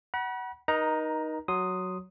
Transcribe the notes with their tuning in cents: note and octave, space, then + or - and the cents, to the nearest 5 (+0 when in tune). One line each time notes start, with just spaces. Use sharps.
F#5 +20 B5 -40
D#4 +0 A#4 +40 A#5 +10
F#3 +0 C6 +0 D#6 +0